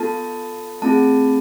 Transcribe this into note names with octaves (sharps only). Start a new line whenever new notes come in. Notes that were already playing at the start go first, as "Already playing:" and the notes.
Already playing: B3 F4 A4 A5
A3 C4 F4 G#4 A5